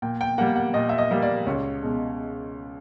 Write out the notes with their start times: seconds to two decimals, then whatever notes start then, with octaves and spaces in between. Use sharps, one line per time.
0.02 A#2 G5
0.21 G5
0.38 G3 A#3 F#5
0.56 F#5
0.74 A#2 D#5
0.89 E5
0.98 D#5
1.11 G3 A#3
1.22 D5
1.46 C#2 C#5
1.82 B2 G#3